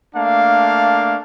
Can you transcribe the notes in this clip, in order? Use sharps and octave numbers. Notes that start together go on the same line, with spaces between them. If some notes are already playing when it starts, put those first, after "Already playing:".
A3 A#3 D4 F5